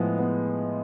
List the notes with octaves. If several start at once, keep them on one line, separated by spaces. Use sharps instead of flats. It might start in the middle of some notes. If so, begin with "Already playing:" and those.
Already playing: A2 F3 G#3 B3
B3